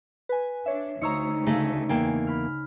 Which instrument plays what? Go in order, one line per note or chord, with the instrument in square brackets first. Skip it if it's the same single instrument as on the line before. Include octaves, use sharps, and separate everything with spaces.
[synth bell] B4 G#5
[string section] D4 [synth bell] C#5 E5
[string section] D2 [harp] D#4 C5 C#5 [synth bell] A#5 E6 C#7
[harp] C#3 [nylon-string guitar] A3 D#4 G#4
[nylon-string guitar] E2 A#3 G5 [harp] G#5
[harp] B5 F6